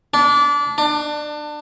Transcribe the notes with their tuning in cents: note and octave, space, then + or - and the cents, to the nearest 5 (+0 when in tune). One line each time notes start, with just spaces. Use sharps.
D4 -25
D4 +25